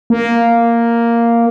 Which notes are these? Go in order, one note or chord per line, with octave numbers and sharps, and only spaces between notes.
A#3